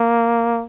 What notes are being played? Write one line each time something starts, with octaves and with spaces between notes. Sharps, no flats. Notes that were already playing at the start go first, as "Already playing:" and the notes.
Already playing: A#3